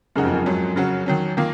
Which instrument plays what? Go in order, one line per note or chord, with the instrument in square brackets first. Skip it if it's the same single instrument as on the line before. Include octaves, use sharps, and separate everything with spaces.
[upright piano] F#2 [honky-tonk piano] C#3 G#3 D#4 F#4
[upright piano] F2
F#2
[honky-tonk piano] G#2 F#3 C#4
C#3 F#3 C#4 F#4
D#3 F#3 C#4
D#3 A#3 F4